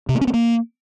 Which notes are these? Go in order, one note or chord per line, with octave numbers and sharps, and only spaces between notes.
C3
A#3
C#4
B3
A#3